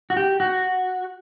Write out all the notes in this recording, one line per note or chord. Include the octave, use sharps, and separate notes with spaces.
F#4
G4
F#4